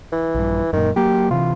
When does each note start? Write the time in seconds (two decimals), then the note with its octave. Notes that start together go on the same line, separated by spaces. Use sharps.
0.12 E3
0.35 A#1 G2
0.73 F#2 A#2 D#3
0.96 F#3 A#3 G4
1.31 C3 E3 F4